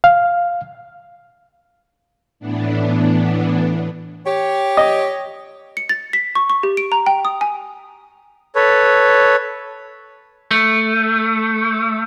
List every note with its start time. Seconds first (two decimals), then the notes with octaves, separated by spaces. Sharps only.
0.04 F5
2.40 A2 E3 B3 D4
4.25 G4 C#5
4.77 D#5
5.77 C#7
5.89 A6
6.13 B6
6.35 C#6
6.50 C#6
6.63 G4
6.77 D7
6.92 A#5
7.06 G5
7.25 D#6
7.41 G#5
8.55 A4 B4 C#5
10.51 A3